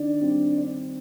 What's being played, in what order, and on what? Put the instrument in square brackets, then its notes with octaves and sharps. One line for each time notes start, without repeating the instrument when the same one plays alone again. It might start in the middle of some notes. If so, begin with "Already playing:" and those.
Already playing: [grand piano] D#3 [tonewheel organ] D4
[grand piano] G3 C4